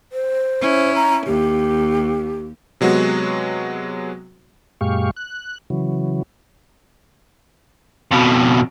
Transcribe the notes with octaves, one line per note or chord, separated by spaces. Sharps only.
C5
C#4 E4
A#5
D#2 G4
C3 F#3 G#3 B3 F#4
F#2 A#2 G#3 G4 F5 C#6
F#6
C#3 E3 F#3
F2 B2